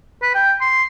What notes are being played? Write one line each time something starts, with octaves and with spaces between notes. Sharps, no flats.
B4
G5
C6